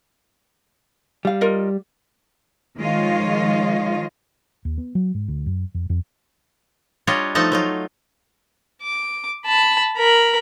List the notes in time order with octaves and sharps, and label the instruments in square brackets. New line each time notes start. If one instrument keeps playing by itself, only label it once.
[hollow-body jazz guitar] G3 F5
[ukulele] F4 A#4 D#5
[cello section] D#3 F3 G#3 F4 C#5 D#5
[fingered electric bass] D#2
B3
F#3
G#2
D2
F#2
F2
F2
[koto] G3 D4 F4 C#5 D#5
F3 A3 D#4 A4 A5 A#5
F#3 D#4 F4
[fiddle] D6
A5 B5
A#4 B5